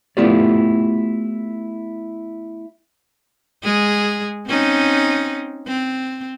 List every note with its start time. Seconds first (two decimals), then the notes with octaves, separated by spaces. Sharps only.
0.17 A3 B3 E4 F4 G4 D5
3.64 G#3 G#4
4.47 C4 C#4 D#4
5.68 C4